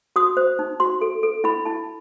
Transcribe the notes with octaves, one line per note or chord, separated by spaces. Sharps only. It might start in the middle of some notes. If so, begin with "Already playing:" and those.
F#4 D#6
C5
D#4
F#4 C6
A4
A4
E4 B5
E4 A5